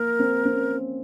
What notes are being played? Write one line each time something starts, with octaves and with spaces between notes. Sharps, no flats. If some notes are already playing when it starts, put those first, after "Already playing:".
Already playing: A#3 A#4
C4
C4
C#4